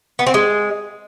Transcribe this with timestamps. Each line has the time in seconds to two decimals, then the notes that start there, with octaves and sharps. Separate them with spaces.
0.19 B3
0.27 C4
0.34 G#3